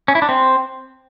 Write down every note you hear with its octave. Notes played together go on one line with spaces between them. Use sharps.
C#4
E4
D4
C4